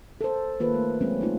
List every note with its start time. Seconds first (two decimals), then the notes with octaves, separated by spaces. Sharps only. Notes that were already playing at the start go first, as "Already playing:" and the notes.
0.21 A4 C5
0.60 D#3 A#3 F4 B4
0.74 A3
1.01 F#3 G#3 C4 C#4
1.21 A3 D#4 F4